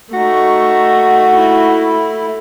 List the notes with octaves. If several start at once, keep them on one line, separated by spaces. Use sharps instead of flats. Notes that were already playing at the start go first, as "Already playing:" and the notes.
A3 D#4 F#4
E4